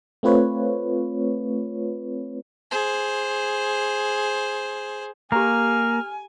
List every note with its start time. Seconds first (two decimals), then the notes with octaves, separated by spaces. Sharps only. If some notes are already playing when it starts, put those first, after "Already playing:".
0.23 A3 C4 F4 B4 C#5
2.71 G#4 C5
5.32 A#3 G4 A4 G#5 A#5 F6